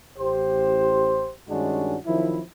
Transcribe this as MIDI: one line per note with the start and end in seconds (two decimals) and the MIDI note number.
0.18 1.31 33
0.18 1.31 67
0.18 1.31 72
1.49 1.97 43
1.49 1.97 51
1.49 1.97 56
1.49 1.97 61
1.49 1.97 62
1.49 1.97 66
2.05 2.41 51
2.05 2.41 53
2.05 2.41 54
2.05 2.41 60
2.05 2.41 64